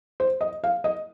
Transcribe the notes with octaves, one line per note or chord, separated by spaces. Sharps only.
C5
D#5
F5
D#5